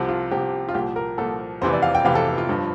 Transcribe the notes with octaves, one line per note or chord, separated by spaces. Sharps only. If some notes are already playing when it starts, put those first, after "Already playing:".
Already playing: C2 C3 F3
F4
C2 C3 F3 G4
F4
C2 A#2 F3 G4
A#4
C2 A#2 F3 A4
F1 E2 C3 E3 C5
D5
F5
G5
F1 E2 C3 E3 F5
A4
F4
G1 G2 F3